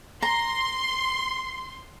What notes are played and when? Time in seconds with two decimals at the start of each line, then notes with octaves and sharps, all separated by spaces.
0.22 A#5 C6